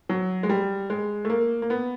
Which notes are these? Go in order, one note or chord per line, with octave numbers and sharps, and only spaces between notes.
F#3
G#3
G3
G#3
A3
A#3
A#3
B3